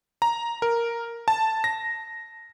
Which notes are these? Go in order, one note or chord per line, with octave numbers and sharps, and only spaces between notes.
A#5
A#4
A5
A#6